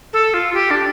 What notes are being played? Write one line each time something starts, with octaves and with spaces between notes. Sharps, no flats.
A4
F4
G4
D4